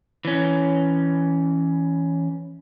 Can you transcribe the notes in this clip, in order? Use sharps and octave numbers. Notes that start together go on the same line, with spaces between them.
E3 C#4